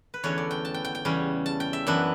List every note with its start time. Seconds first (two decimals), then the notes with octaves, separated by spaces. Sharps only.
0.14 B4
0.23 E2 D3 A3 C#4 C#5
0.38 D5
0.51 G5
0.65 A5
0.74 G5
0.85 G5
0.95 G5
1.05 E2 C#3 G3 C#4
1.46 A5
1.60 G5
1.73 E5
1.87 F#2 E3 B3 D4